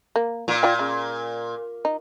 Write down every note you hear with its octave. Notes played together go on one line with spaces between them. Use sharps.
A#3
A#2
F4 D5 G5
C#3
D#4